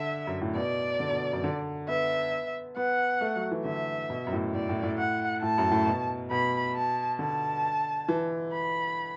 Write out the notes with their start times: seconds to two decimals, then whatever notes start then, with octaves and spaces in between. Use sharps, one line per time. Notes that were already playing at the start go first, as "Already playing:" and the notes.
Already playing: D3 E5
0.27 F#2
0.41 A2
0.55 B2 D5
1.00 D3
1.11 B2
1.33 F#2
1.44 D3
1.89 B3 E5
2.76 B3 F#5
3.21 A3
3.35 F#3
3.51 E3
3.65 D3 E5
4.10 B2
4.27 F#2
4.33 A2
4.54 A2 D5
4.69 A2
4.83 A2
4.98 F#5
5.42 A2 A5
5.58 F#2
5.71 A2
5.86 B2
6.31 B2 B5
6.76 A5
7.19 D3 A5
8.08 E3
8.53 B5